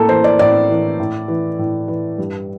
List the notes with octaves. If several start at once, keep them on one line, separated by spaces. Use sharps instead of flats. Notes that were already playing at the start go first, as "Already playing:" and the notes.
Already playing: A2 A#3 A4
E3 C5
D5
A2 D5
E3
A2
E3
A2
E3
G2